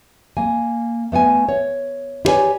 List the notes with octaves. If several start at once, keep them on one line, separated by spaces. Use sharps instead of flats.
A#3 G#5
A3 B3 F#5 G#5
C#5
E4 G4 B4 C#5 D5 G#5